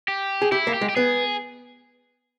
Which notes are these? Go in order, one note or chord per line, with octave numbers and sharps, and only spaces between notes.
G4
G#4
E4 G4
A#3
G4
G#3
G4
B3 G#4